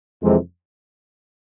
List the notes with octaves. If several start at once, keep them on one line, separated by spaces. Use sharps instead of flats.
F2 C3 E3 G#3 C4